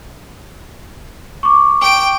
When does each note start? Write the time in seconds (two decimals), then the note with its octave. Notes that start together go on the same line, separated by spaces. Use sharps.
1.43 C#6 D6
1.81 G5 D7